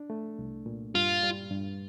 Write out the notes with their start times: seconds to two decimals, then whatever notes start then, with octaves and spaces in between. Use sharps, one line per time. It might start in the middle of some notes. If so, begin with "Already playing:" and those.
Already playing: D4
0.10 A3
0.39 C2
0.66 A#2
0.95 G2 F4
1.23 G3
1.51 G2